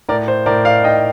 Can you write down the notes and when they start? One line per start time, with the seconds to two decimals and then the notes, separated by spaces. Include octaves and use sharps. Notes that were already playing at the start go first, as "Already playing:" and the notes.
0.09 A2 A#4 D5
0.28 C5
0.46 A2 A#4 D5
0.65 D5 F5
0.84 D#4 D#5 G5